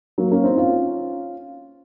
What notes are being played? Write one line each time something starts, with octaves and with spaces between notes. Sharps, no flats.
F#3 A#3
A#3 C#4
C4 D#4
C#4 F4